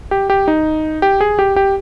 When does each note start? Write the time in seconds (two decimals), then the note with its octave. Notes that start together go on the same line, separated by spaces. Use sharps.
0.11 G4
0.30 G4
0.48 D#4
1.02 G4
1.21 G#4
1.39 G4
1.56 G4